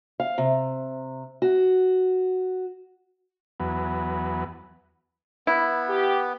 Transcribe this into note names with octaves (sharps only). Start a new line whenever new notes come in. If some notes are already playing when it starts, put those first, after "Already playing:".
F5
C3
F#4
E2 F#3 B3
B3 E4
G4